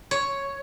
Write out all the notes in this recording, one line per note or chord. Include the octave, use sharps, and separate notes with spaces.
C#5